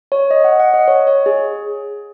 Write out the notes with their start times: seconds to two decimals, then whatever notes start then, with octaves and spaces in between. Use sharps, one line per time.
0.12 C#5
0.31 D#5
0.44 F#5
0.60 F#5
0.74 D#5
0.88 C#5
1.07 C#5
1.26 G#4